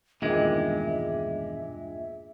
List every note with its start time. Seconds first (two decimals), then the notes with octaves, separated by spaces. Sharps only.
0.22 E1 G2 A#2 D#3 G#3 E5